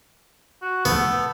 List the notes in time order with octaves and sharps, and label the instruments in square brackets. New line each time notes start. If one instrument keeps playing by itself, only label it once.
[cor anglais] F#4
[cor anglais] A3 [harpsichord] B3